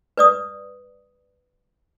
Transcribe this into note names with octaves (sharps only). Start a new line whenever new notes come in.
B4 D5 D#6